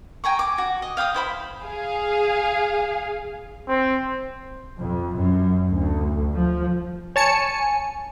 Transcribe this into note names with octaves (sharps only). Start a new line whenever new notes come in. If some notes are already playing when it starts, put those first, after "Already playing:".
G5 G#5 A#5 C#6
D6
F#4
D#5
F5 G5 B5 D#6
E4 C5 B5
G#4 F5
C4
F2
F#2
D2
F3
C#5 G#5 A5 C#7